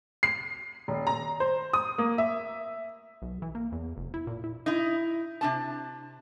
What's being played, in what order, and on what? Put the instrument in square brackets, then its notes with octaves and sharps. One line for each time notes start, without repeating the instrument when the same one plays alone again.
[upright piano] C7
D#1
A#5
C5
D#6
A#3
E5
[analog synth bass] B1
E3
A#3
E2
F1
E4
A#2
E4
[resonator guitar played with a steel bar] D#4 E4
C3 D4 A5